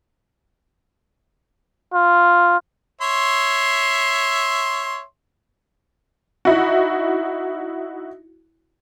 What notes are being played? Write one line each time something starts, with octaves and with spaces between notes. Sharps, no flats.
F4
C#5 E5 C6
D#4 E4 F#4